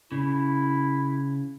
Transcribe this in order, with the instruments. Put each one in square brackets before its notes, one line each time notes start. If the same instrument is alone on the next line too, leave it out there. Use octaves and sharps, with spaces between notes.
[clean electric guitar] C#3 [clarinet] E4